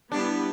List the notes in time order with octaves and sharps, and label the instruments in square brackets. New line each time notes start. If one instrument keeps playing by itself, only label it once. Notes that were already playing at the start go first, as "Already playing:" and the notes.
[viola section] G3 B3 E4 G4 B4 [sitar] D4